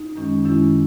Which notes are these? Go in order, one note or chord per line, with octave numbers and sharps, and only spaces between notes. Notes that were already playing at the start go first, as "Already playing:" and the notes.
Already playing: D#4
F#2 D#3 G#3 C#4
F#2 D#3 G#3 C#4 E4